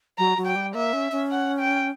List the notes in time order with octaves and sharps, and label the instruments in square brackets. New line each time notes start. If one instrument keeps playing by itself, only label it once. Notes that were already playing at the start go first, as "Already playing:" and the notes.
[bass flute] F#3 [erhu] A#5
[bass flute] F#3
[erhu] G5
[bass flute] G3
[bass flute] A#3 [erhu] E5
[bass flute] C#4
C#4
[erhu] F#5
G5